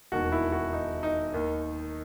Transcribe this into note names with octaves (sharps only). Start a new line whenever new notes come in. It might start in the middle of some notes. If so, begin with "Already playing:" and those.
E1 D#2 D#3 F#4
E4
F#4
D#4
D#4
D#2 D#3